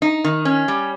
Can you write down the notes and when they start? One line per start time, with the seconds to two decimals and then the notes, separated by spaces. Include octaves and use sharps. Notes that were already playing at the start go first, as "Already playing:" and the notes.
0.02 D#4
0.24 D#3
0.45 C#4
0.68 G3